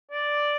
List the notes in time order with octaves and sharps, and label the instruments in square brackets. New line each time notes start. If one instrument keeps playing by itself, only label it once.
[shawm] D5